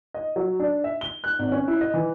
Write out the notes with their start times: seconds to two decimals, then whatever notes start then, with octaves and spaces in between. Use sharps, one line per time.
0.14 D#5
0.36 F#3
0.60 D4
0.84 E5
1.01 G7
1.24 F#6
1.39 G#1
1.52 C#4
1.68 E4
1.81 D#5
1.94 E3